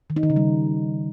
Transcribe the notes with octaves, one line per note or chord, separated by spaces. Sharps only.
D#3
D#4
D#3
C#3
G3